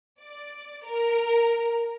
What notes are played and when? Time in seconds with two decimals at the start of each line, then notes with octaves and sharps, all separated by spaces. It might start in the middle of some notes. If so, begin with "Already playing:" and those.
0.21 D5
0.86 A#4